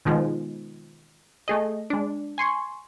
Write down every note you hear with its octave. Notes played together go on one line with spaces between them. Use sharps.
B2 D#3 F3 G#3
A3 G#4 D#5
G#3 D4
G#5 C6 C#6